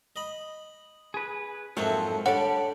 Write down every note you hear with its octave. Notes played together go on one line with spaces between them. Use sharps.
D#5 B5
G#4 B4
F2 G#2 F3 F#3 A#3 C4 A4 E5
D3 G3 G4 A4 C#5 D5 F#5